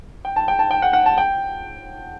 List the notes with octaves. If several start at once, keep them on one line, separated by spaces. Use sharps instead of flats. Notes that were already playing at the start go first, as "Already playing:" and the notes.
G5
A5
G5
A5
G5
F#5
F#5
A5
G5